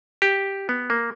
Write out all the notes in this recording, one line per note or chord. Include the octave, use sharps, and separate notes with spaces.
G4
B3
A#3